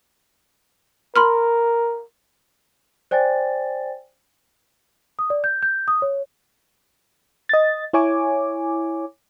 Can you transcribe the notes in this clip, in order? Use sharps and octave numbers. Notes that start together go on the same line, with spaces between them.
A#4 B5 C6 F6
C5 D5 G5 G#5 A6
D#6
D5
G6
G6
D#6
C#5
D#5 A6
E4 C#5 G#5 D6